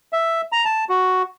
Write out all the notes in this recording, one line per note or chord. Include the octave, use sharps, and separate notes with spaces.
E5
A#5
A5
F#4